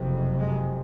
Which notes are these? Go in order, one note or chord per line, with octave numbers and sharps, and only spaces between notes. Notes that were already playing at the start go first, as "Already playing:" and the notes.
Already playing: F#1 F2 C3
G#3